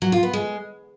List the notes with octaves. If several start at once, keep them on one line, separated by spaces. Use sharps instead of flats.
F#3
F4
B3
G#3